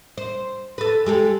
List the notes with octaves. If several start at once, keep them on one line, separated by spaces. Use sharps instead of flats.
C5
A4 B4
G#3 G4 A4